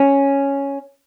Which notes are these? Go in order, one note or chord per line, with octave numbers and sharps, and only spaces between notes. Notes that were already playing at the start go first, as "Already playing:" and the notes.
Already playing: C#4